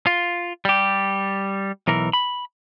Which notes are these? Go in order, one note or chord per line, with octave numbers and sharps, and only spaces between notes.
F4
G3 G4
B1 E3 A#4
B5